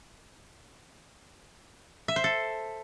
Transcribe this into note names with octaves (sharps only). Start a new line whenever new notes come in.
E5
C5
A4